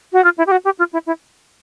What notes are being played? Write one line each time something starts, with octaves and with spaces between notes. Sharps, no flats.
F#4
F4
E4
G4
F#4
G4
F4
E4
E4